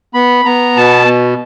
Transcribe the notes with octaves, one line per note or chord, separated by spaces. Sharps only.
B3 B5
B3 A#5
B2 A5